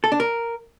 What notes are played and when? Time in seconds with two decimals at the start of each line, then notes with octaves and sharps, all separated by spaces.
0.04 A4
0.12 D4
0.20 A#4